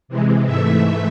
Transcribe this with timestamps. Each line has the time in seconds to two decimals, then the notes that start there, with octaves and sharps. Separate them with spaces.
0.08 C3 E3 G#3
0.45 G#2 E3 A3 E5